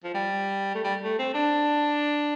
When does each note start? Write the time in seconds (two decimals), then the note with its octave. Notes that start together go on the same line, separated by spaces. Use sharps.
0.04 F3
0.14 G3
0.75 A3
0.84 G3
1.04 A3
1.19 C4
1.34 D4